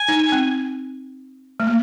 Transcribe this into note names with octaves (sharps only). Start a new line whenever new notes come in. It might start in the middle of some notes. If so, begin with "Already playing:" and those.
Already playing: G#5
D#4
C4
A3
A#3